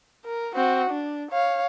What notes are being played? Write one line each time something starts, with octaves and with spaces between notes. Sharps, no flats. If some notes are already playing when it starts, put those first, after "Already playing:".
A#4
C4 F#4
D4
C#5 F5